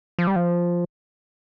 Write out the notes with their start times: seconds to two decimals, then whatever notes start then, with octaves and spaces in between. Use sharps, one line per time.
0.19 F3
0.27 G3
0.36 F3